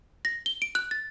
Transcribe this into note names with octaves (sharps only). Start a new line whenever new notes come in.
A#6
G7
D7
F#6
A6